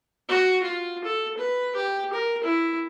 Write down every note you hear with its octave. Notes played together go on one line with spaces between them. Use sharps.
F#4
F4
A4
B4
G4
A#4
E4